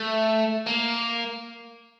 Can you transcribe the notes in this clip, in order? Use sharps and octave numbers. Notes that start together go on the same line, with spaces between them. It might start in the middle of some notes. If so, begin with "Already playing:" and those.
Already playing: A3
A#3